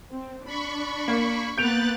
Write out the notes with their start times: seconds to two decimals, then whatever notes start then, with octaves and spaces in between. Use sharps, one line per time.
0.11 C4
0.45 D4 B5 C#6
1.08 A#3
1.58 A#3 B3 F#6 G6 A6 D7 F7